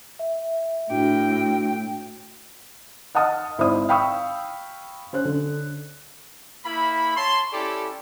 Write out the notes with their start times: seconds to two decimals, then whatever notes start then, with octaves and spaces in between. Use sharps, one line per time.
0.19 E5
0.90 A2 D4 F#4 G5
3.15 D#5 F#5 A5 D#6 F6
3.58 G#1 E4 C5 D5 D#6
3.89 F5 G5 B5 C#6 D#6 E6
5.13 C#4 C5 F#6
5.25 D3
6.65 A#3 E4 B5
7.16 C#5 A5 C6
7.53 C#4 E4 G4 A4 D5